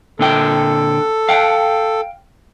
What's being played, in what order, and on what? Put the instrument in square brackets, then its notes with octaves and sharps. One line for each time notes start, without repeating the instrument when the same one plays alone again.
[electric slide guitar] A#2 D3 G5 [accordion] A4
[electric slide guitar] F5 G5